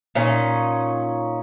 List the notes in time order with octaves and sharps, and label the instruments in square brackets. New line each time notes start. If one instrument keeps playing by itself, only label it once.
[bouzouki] A#2 C#4 D#4